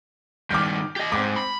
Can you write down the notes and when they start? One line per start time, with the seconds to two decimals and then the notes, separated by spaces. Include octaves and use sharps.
0.51 G2 D#3 D6 F6 G6
0.96 G4 D#5
1.12 G#2 C4 D6
1.36 B5